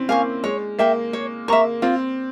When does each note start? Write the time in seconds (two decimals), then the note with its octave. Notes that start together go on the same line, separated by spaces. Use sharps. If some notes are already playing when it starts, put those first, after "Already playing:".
Already playing: C4 C#4 E4
0.09 A#3 F5 G#5 C#6
0.44 G#3 C#5
0.79 A#3 E5 G5
1.13 C#5
1.48 A#3 E5 A#5 C#6
1.82 C4 F4